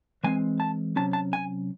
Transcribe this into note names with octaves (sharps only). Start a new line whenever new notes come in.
E3 G#3 C4 G#5
A5
C3 F#3 C#4 A5
A5
G#5